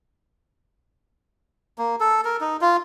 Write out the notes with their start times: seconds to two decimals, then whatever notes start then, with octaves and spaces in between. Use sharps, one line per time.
1.78 A#3
2.00 A4
2.25 A#4
2.41 D#4
2.61 F4